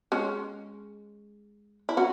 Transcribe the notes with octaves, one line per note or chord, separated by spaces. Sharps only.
G#3 C#4
E4
C#4 F#4